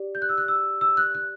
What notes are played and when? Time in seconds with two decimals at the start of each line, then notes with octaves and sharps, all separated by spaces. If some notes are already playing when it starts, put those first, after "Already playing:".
Already playing: G4 D5
0.15 G6
0.22 F#6
0.29 E6
0.38 F#6
0.48 E6
0.81 E6
0.97 F#6
1.15 F#6